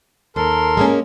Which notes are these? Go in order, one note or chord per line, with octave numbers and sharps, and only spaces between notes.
D#2 A4 A#4 C6
G#3 A#3 C#4